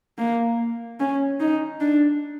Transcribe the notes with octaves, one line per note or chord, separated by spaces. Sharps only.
A#3
C#4
D#4
D4